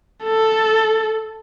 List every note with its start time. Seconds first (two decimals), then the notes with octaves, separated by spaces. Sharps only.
0.25 A4